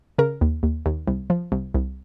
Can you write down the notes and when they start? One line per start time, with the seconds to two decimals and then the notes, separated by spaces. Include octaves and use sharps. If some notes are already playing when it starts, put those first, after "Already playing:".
0.18 C#3 A#4
0.41 D#2
0.63 D#2
0.86 D#2
1.07 C2
1.30 F3
1.52 C2
1.74 C2